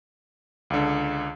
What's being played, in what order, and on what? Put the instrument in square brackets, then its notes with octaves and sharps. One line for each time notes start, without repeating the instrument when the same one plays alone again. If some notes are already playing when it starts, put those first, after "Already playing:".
[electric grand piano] C#2 D3